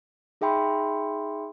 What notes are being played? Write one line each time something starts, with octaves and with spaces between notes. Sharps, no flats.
D#4 G#4 E5 G5 B5 C6